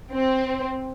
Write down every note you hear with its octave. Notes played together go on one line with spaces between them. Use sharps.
C4